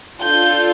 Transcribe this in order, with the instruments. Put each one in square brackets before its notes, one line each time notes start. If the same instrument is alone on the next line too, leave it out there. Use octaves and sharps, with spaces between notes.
[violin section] D4 F4 A4 G6